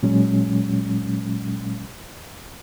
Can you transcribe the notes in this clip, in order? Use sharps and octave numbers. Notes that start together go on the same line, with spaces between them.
A#2 F#3 G#3 C#4